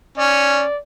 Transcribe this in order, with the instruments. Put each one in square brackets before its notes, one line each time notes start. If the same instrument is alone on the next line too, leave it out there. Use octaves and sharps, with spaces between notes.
[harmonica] C#4 [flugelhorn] D5